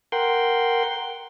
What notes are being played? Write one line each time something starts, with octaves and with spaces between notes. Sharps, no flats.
A#4 F#5 G5 C6